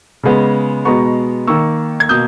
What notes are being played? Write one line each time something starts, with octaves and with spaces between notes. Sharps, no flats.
C#3 G#3 B3
B2 G#3 B3 A#5 C#6
D#3 A#3 C#6 E6
G#6
B2 A#3 D#6 G6